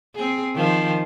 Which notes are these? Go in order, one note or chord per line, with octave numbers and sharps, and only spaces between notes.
C4 G#4
D#3 F3 C5